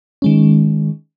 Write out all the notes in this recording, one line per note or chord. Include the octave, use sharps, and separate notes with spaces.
D#3 G#3 C#4